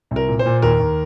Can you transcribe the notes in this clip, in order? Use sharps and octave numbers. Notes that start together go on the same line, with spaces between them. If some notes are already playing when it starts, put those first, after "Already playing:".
C2
A#4
A#2
C5
A#2
D#2 A#4
D#2